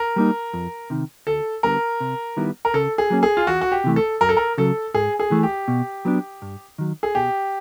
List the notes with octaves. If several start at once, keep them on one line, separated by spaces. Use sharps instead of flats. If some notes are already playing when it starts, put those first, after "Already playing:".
Already playing: A#4
G3 A#3 D#4
F2
C3 D#3
D2 A4
D3 G3 B3 A#4
C3
D#3 G3 B3 E4
A#4
C#3 A4
G#4
F#3 A#3 C#4
G#4
F4
E2 F#4
F#4
G4
C3 E3 A3
A4
F#2 A#4
A4
A#4
C#3 F#3 A4
G#2 G#4
G#4
E3 A3
G4
B2
F#3 B3 D4
G2
D#3 F#3
G#4
B2 G4